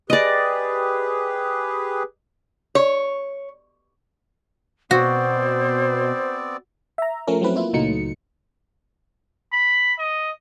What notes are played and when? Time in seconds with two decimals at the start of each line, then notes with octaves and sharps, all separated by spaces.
0.10 G4 G#4 B4 D5 D#5
2.75 C#5
4.91 B2 B3 C4 F#4 C5 D5
6.98 E5 A#5
7.27 F3 A3 C#4 A#4
7.41 F#3 A3 C4 E4 B4
7.56 A#3 E4 F4
7.73 C#2 A#2 F#3 A3 D#4 C#7
9.52 B5
9.99 D#5